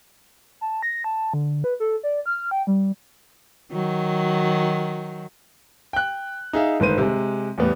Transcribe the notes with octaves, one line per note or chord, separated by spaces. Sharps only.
A5
A#6
A5
D3
B4
A4
D5
F6
G5
G3
D#3 F#3
G5 F#6
D#4 G#4 E5 F5
G1 G#2 D#3 B4 C5 D#7
C3 G#3
E2 A2 G3 B3